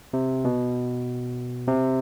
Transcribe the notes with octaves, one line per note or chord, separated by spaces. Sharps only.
C3
B2
C3